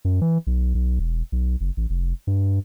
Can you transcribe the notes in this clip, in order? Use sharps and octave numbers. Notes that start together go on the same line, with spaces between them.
F#2
E3
B1
B1
E1
B1
F#1
A1
F1
G2